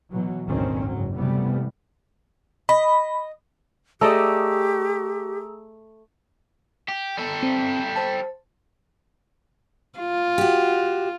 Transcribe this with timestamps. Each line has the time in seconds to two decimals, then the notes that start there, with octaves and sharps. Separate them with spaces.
0.10 B2 E3 F#3
0.46 G#1 D2 B2 D#3 C4 C#4
0.87 F#1 G#2 F#3
1.16 C3 E3 G3 A3 B3
2.69 D#5 B5
4.01 A3 G4 G#4 D5 D#5 A#5 E6
6.88 G4
7.17 G3 A4
7.43 C4
7.96 C5 A5
9.99 F4
10.38 F#4 G4